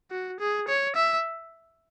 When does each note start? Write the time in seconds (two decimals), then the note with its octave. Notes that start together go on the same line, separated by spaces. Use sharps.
0.11 F#4
0.40 G#4
0.68 C#5
0.96 E5